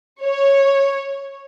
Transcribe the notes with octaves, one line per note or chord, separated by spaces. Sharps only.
C#5